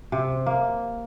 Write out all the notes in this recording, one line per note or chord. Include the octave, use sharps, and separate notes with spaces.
C3
A#3